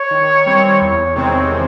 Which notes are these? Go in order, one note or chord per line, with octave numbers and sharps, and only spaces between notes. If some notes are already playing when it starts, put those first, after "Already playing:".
Already playing: C#5
D#3
G3 C4
E2 C#5
C3 D#3 G#3 C4 C#5